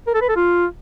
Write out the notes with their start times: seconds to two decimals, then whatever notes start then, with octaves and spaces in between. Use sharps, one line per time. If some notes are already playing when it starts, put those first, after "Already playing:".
0.07 A#4
0.14 A4
0.22 B4
0.29 A4
0.36 F4